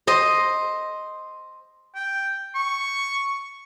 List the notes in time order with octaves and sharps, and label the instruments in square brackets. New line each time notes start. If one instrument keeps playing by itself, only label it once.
[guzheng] C5 D#5 C6
[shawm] G5
C#6